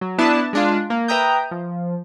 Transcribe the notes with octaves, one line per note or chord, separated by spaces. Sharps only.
F#3
B3 D4 E4 B4 A5
G#3 D4 F4
A#3
B4 E5 G5 A#5 D#6 G6
F3